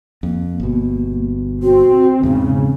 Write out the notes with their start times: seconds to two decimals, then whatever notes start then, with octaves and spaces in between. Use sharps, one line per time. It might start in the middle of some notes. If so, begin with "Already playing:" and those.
0.23 F2 A#3
0.60 G1 B2
1.63 C4 F#4
2.23 E2 G#2 C#3 C4